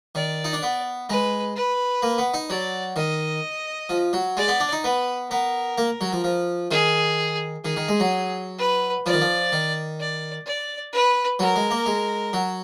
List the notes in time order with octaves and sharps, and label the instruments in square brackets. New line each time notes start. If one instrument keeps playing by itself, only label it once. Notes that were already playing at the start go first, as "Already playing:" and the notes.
[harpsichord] D#3 [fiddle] D5
[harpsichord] D#4
D4
B3
[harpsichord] G#3 [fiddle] B4
[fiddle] B4
[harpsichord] A#3
B3
D#4
[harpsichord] F#3 [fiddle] D5
[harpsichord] D#3 [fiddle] D#5
[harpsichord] F3
F#3
[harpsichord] G#3 [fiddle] D5
[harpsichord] B3
D4
D#4
[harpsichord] B3 [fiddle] B4
[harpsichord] B3 [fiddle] A#4
[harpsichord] A#3
F#3
F3
F3
[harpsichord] D#3 [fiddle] G#4
[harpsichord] D#3 [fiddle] G#4
[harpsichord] D#3
G#3
F#3
[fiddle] B4
[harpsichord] F3 [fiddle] D5
[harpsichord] D#3
F3
D#3
[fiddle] D5
D5
B4
[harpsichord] F#3 [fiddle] A#4
[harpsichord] G#3
A#3
G#3
F#3